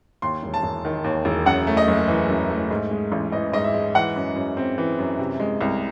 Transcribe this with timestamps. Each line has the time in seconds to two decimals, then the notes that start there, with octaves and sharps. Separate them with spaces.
0.22 D#2 C6
0.43 E1
0.54 A5
0.63 E1
0.85 D#3
1.04 D#2
1.25 E1
1.46 F#2 F#5
1.67 A3
1.77 D#5
1.88 F#1
2.08 E3
2.29 F#2
2.49 A3
2.71 G#2
2.91 G#3
3.12 A1
3.32 E3 D#5
3.53 G#2 D#5
3.64 E5
3.74 G#3
3.95 E3 F#5
4.16 F#2
4.36 F#2
4.57 C4
4.78 E3
4.99 F#2
5.18 C3
5.40 G#3
5.61 C2